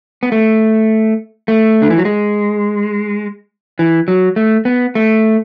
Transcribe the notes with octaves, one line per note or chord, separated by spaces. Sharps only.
B3
A3
A3
D3
E3
F#3
G#3
E3
F#3
A3
B3
A3